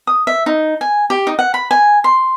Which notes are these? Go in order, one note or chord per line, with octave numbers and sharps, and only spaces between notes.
D#6
E5
D#4
G#5
G4
D#4
F#5
B5
G#5
C6